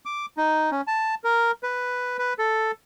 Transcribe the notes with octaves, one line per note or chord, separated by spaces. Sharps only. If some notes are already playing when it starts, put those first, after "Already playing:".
D6
D#4
C#4
A5
A#4
B4
B4
A4